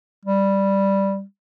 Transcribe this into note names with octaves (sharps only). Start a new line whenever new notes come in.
G3